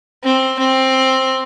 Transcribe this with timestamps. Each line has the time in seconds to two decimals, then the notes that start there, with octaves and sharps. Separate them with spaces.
0.24 C4
0.59 C4